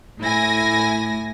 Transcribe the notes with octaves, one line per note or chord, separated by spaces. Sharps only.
A2 E4 G#5 A#6